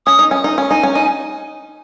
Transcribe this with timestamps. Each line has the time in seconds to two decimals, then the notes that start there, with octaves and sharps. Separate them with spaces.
0.06 C#4 D#6
0.19 D#4
0.31 C#4
0.44 D#4
0.58 C#4
0.70 D#4 G#5
0.83 C#4
0.95 D#4